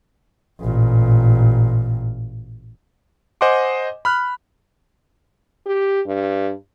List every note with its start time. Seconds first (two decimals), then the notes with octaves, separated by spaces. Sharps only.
0.60 A1 A#2
3.41 C5 D#5 F#5 G#5 C6 D6
4.05 B5 F6 F#6
5.66 G4
6.06 G2